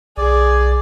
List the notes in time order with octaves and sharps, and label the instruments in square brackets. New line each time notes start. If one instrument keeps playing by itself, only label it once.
[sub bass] B1 [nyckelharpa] G#4 [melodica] D5